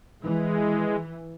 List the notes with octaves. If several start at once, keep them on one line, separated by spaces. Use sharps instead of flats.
E3 G#3